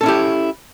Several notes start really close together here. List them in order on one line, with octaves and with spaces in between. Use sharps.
A4 C#4 E4 G4